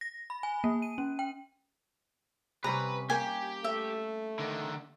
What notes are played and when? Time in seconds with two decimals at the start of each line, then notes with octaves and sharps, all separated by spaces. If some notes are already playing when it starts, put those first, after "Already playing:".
0.01 A#6
0.30 B5
0.43 G#5
0.64 A#3
0.82 D#7
0.98 C#4
1.19 G5
2.64 C3 G3 C#4 B4 A#5
3.10 A#3 G4 G5 G#5
3.64 A3 E5
4.39 D3 D#3